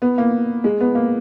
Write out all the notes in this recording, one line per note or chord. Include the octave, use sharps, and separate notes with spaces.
B3
A#3
G#3
B3
A#3